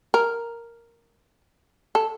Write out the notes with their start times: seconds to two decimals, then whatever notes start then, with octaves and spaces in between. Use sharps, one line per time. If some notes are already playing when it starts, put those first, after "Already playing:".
0.14 A#4
1.95 A4